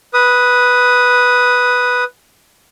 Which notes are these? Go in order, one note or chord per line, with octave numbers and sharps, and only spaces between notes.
B4 D#6